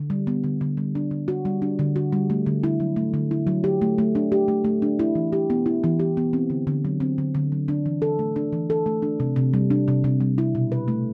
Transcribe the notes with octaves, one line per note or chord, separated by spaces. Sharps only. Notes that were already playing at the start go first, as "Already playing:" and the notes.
Already playing: D3
G3
B3
D3
D3
G3
D4
D3
F#4
G3
D4
D3
F#4
G3
A3
D3
E4
F#3
A3
D3
E4
F#3
G4
A3
A3
D4
G4
A3
A3
D4
E4
E3
G4
B3
E4
E3
G4
B3
C4
D3
D3
F#3
C4
D3
D3
F#3
D4
E3
A4
A3
D4
E3
A4
A3
D4
C3
C3
G3
D4
C3
C3
G3
E4
B2
B4
A3